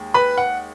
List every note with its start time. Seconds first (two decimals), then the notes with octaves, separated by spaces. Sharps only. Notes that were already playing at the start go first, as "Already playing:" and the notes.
Already playing: D#2 G#3
0.14 B4 B5
0.38 F#5